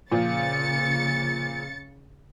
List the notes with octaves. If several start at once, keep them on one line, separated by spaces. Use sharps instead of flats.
A#2 C#3 F3 A6 C#7